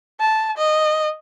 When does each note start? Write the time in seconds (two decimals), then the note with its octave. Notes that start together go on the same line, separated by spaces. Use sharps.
0.20 A5
0.57 D#5